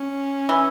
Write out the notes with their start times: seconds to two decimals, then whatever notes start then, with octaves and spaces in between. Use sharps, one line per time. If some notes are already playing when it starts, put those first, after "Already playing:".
Already playing: C#4
0.49 E3